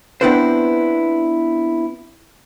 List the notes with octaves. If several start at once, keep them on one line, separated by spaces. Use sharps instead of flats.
B3 C4 D4 E4 B4 C5